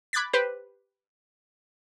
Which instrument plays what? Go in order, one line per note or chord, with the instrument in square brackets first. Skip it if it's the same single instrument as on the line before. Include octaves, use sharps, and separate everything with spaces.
[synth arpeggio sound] B5 D6 F#6 G#6 A6 B6
G4 B4 C5